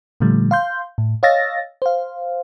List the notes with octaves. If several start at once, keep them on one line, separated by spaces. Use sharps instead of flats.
A#2 D3 F3 G3 A3
F5 C6 G6
A2
C#5 D#5 F5 E6 A6 A#6
C5 F5